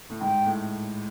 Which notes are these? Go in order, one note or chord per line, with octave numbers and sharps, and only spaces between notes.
A2
G#2 G5
A2